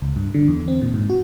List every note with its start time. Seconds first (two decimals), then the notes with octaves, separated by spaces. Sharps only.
0.02 C#2
0.16 G2
0.34 D3
0.48 E2
0.68 C4
0.82 A#2
0.94 G#2
1.10 F#4